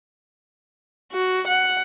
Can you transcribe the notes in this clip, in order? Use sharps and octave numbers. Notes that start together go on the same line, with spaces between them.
F#4
F#5